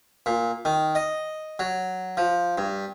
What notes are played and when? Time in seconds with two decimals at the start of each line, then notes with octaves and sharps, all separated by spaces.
0.26 A#2
0.65 D#3
0.95 D#5
1.59 F#3
2.17 F3
2.58 G2